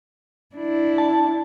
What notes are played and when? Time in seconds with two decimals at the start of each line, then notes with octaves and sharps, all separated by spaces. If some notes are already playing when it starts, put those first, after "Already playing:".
0.55 D4 E4
0.98 A5